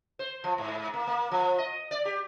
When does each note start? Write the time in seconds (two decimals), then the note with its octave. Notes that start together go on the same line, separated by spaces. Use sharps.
0.19 C5
0.44 F3
0.58 G#2
0.94 A#3
1.07 A#3
1.31 F3
1.58 D#5
1.91 D5
2.05 G4